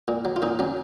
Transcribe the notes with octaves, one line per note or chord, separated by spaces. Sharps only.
A#2
F#3
F4
A#2 D#4
F#3 C#4